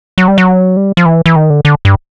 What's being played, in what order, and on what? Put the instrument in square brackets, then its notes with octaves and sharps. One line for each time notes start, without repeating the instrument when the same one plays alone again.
[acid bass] F#3
G3
F#3
G3
F3
E3
E3
D#3
D3
D3
G2